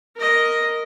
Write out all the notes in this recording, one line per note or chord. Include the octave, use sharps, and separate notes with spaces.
A#4 D#5